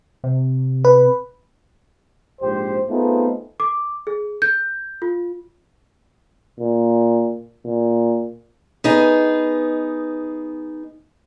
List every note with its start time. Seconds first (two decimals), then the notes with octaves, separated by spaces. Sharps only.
0.24 C3
0.85 B4
2.41 A#1 G#2 G4 C5
2.90 A3 B3 C4 D#4 F4 G#4
3.60 D6
4.07 G#4
4.42 G6
5.02 F4
6.60 A#2
7.66 A#2
8.84 B3 D#4 G#4